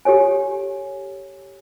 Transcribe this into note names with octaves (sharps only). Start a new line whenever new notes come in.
G4 A4 C#5 G#5